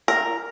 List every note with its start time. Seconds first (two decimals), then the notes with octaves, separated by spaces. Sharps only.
0.08 A#4